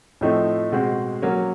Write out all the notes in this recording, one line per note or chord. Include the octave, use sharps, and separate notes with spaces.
A2 F3 A3 C4 D#4
B2 G#3 C4
F#3 A#3 C#4